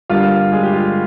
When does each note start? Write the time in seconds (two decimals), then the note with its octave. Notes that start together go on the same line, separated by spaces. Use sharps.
0.10 G1 G2 G3 A#3 F4 F5
0.52 G#3 G#4
0.63 G4
0.73 F4